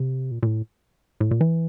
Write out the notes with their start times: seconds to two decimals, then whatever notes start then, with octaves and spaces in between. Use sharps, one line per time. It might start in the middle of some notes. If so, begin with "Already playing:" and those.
Already playing: C3
0.31 A#2
0.43 A#2
0.46 A2
1.21 A2
1.31 A#2
1.41 E3